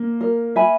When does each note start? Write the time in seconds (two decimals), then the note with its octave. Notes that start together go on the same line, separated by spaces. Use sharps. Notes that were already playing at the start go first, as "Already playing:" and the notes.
Already playing: A#3
0.21 A#4
0.56 E5 G#5 B5